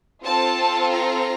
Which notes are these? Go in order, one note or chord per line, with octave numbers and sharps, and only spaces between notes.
C4 F4 A4 A5
A#5